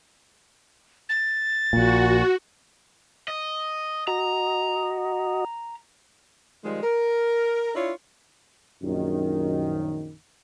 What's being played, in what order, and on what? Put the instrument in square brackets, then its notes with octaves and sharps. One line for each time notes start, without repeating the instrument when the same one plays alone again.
[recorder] A6
[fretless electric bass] A#1 A#2 [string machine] F#4
[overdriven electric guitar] D#5
[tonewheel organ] F#4 D#5 [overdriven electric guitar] A#5
[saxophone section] D#3 F3 G3 G#3
A#4
D4 E4 F4 C#5
[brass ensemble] A#1 F#2 D#3